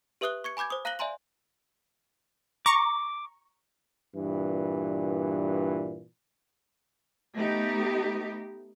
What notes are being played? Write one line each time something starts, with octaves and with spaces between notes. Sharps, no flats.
G4 B4 E5 D#6 F#6 G7
C#6 G#6 C#7
G#5 B5 D6 G6 G#6
C5 D#6
F5 A#5 F#6 A#6 F#7 G7
D5 E5 G#5 A#5 C6 F#7
A#5 C#6 D6
G2 A#2 E3
A3 B3 D#4 G4